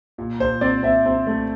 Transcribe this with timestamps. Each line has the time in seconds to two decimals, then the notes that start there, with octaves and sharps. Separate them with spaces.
0.18 A#2
0.40 A#2 C5
0.61 C4 D5
0.83 C4 E5
1.06 C4
1.27 A3